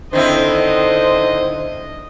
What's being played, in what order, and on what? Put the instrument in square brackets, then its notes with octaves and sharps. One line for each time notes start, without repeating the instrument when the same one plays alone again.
[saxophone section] D3 C5 [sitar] D#3 C4 E4 [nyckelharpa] D#5